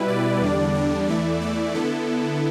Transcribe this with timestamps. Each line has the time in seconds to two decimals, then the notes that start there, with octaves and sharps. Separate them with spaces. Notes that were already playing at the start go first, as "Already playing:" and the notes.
Already playing: B2 G3 E4 B4
0.08 D5
0.42 E2 D3 G3 D4
0.75 D5
1.08 E2 E3 A3 E4 D5
1.42 D5
1.75 D3 B3 E4 A4